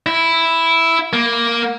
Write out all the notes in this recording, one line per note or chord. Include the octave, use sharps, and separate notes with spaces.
E4
A#3